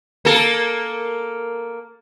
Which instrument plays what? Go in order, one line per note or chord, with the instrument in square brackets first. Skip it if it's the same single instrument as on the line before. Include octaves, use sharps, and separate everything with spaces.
[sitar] A#3 A4